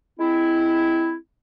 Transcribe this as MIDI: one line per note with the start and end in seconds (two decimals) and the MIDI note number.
0.19 1.15 56
0.19 1.15 60
0.19 1.15 64